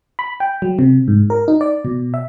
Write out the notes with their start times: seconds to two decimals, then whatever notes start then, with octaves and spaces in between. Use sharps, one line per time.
0.19 B5
0.40 G5
0.62 F#3
0.79 C3
1.08 G#2
1.30 A#4
1.48 D#4
1.61 D5
1.85 B2
2.14 E5